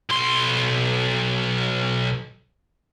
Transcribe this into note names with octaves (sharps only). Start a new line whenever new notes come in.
B1 C6